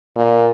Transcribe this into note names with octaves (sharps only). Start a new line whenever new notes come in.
A#2